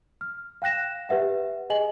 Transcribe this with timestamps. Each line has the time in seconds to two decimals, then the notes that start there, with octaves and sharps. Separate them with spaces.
0.21 F6
0.62 F5 G5 F#6 A#6 E7
1.09 G4 B4 E5 F#5
1.70 G#4 D#5 G#5 F#7